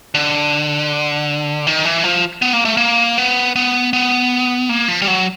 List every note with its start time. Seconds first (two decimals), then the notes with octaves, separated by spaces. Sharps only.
0.14 D3
1.67 D#3
1.85 E3
2.04 F3
2.42 B3
2.53 A#3
2.65 A3
2.77 A#3
3.18 B3
3.56 B3
3.93 B3
4.69 A#3
4.88 F3
5.02 G3
5.07 F#3